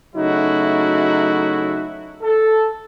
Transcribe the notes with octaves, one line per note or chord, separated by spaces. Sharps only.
C#3 F#3 A3 D#4 E4 F#4
A4